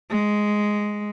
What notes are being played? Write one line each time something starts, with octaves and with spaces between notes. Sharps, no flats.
G#3